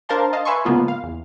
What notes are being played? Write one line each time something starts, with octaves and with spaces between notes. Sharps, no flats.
D4 A#4 C5 F5 A5 C6
D#5 F5 A5
B4 E5 G#5 C6 C#6
G#2 C#3 F3 A#3 B3 F4
F5
E2